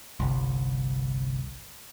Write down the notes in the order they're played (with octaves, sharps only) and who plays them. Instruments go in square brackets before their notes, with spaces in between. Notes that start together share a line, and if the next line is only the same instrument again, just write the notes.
[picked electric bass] G1 C2